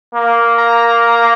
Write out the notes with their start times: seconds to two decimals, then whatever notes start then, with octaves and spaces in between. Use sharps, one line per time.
0.15 A#3
0.58 A#5